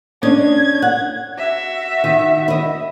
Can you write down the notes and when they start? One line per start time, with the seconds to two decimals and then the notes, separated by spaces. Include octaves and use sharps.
0.23 C#4 D4 D#5 G#6
0.82 F#5
1.37 F#4 E5
2.04 D#3
2.48 E4 D#5